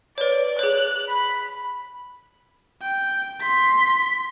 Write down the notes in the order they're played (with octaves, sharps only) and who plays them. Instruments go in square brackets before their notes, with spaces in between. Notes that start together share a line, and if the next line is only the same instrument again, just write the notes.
[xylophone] B4 C#5 [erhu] D5
[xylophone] G#4 C#5 [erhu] F#6
[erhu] B5
[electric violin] G5
C6 B6